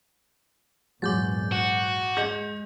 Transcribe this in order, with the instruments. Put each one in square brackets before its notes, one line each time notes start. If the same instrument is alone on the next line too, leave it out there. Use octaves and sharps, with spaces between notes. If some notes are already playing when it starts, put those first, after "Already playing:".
[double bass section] G#1 E2 A#2 [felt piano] F#3 G#3 [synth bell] D6 G6 A6
[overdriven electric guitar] F#4
[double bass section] G#3 [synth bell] G#4 D#5 [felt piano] G6